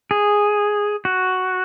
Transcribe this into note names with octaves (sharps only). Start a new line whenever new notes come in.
G#4
F#4